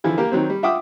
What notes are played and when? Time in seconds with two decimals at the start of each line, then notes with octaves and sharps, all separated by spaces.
0.04 D3 E3 F3
0.18 A#3 G4 A#4
0.32 D#3 F#3 C4
0.50 G3
0.63 F4 E5 F#5 G5 D6 D#6